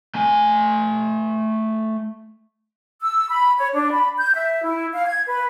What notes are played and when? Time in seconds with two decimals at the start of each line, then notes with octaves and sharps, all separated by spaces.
0.15 A3 G#5
3.01 E6
3.30 B5
3.58 C#5
3.74 D4
3.93 B5
4.18 G6
4.35 E5
4.63 E4
4.93 F5
5.06 G#6
5.26 B4